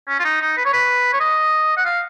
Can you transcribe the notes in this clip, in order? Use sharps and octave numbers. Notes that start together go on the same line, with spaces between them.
C#4
F4
D#4
D#4
B4
C#5
B4
C#5
D#5
F#5
F5